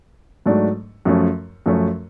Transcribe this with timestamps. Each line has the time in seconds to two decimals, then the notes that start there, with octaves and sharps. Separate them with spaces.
0.46 G#2 F#3 A3 D4
1.05 F#2 F3 A3 C#4
1.66 F#2 F3 A3 C#4